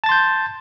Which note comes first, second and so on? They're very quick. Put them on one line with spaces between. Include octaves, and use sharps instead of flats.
A5 A6 C6 G6